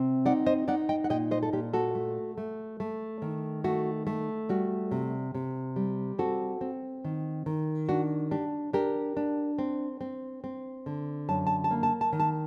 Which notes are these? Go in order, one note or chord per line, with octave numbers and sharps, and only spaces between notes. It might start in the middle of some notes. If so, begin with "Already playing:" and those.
Already playing: C3 C4
D#4 D5 F#5
C5 D#5
D#4 D5 F#5
D#5 G5
F#5
A#2 D#5 G5
C5 D#5
A4
A#2 G4
F#4 A4
A3
A3
A3
D#3
A3 F#4
A3
G3 F#4
C3
C3
G3
C4 F#4 A4
C4
D#3
D#3
D4 F#4
D4 G4
D4 G4 A#4
D4
C4
C4
C4
D3
F#2 A5
A5
A5
A#3
A5
A5
D#3
A5